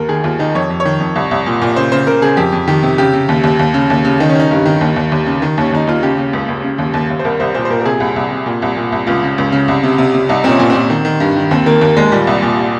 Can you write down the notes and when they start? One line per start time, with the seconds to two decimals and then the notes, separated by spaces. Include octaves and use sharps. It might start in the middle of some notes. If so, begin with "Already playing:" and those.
Already playing: D#2 A#4
0.08 D#3 G#4
0.24 D#2 F4
0.39 D#3 D#4
0.55 F2 C#5
0.70 F2
0.80 C#5
0.85 D#3
1.00 F2
1.16 C2
1.31 C2
1.46 A#2
1.62 A#2
1.76 C#3 C5
1.92 C#3 C5
2.07 C#3 A#4
2.22 C#3 G#4
2.37 F2 G4
2.52 F2
2.68 D#3 G4
2.83 C3
2.98 C#3 G4
3.13 C#3
3.29 D#2
3.44 D#2
3.59 D#2
3.74 C#3
3.90 D#2
4.05 C#3
4.20 D#3 D#4
4.29 C#4
4.35 D#3 D#4
4.51 G2
4.66 D#3
4.81 D#2
4.96 D#2
5.12 D#2
5.26 C#3
5.42 D#3
5.58 D#2 C#4
5.72 D#2 D#4
5.87 D#2 F4
6.03 C#3 G4
6.18 C#3
6.33 C#2
6.48 C#2
6.64 C#3
6.78 D#2
6.94 D#2
7.10 D#2
7.19 C5
7.25 C2 A#4
7.40 C2 C5
7.54 A#2 C5
7.65 C5
7.70 A#2 A#4
7.81 A#4
7.85 C3 G#4
8.00 C2
8.16 C2
8.31 C3
8.46 A#2
8.62 C2
8.76 A#2
8.92 C2
9.07 C#2 F4
9.23 C#3
9.38 C#2
9.52 C#3
9.68 C2
9.83 C3
9.98 C3
10.14 C3
10.29 C2 D#4
10.44 A#2 C4 C#4
10.60 A#2
10.70 C4
10.75 A#2
10.90 D#3
11.05 D#3
11.20 G2
11.36 D#3
11.51 D#2 C4
11.66 D#3 A#3
11.81 D#2 A#3
11.96 D#2 G#3
12.12 A#2 G3
12.27 C2
12.42 A#2